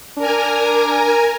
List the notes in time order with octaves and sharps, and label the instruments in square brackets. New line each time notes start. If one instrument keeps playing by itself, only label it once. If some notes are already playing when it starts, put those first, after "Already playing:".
[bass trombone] D4 [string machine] A#4 G#5 A#5